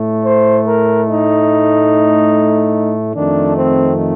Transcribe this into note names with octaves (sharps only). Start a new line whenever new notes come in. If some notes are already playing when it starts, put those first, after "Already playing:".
Already playing: A2 A3
C5
A#4
D#4
F2 D#3 A3 D4
C4